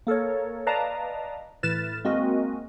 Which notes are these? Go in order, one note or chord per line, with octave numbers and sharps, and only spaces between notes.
A#3 A4 A#4 C#5
B4 D5 D#5 F5 A5 A#5
A2 E3 B4 F6 A6 E7
G#3 A#3 C4 F#4 A#4 D#5